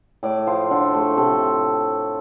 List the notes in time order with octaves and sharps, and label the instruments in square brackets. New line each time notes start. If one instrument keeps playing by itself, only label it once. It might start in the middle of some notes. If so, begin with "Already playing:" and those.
[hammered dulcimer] A2 D5
F3 C5
D3 A4
A3 A4
C3 A4